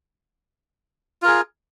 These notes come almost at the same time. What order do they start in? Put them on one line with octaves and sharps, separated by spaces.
F4 A#4 G#4